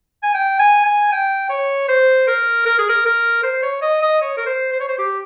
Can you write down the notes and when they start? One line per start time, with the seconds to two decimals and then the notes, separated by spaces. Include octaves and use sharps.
0.23 G#5
0.34 G5
0.59 G#5
0.85 G#5
1.12 G5
1.50 C#5
1.89 C5
2.28 A#4
2.66 A#4
2.79 G#4
2.89 A#4
3.06 A#4
3.44 C5
3.63 C#5
3.82 D#5
4.02 D#5
4.22 C#5
4.37 A#4
4.46 C5
4.73 C5
4.81 C#5
4.89 C5
4.99 G4